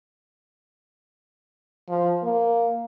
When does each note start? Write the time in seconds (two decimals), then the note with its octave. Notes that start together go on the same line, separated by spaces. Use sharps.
1.89 F3
2.23 A#3